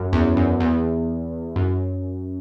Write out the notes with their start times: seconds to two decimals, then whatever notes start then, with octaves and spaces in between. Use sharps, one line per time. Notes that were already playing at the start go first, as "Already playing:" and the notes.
Already playing: F#2
0.13 E2
0.37 F#2
0.60 E2
1.56 F#2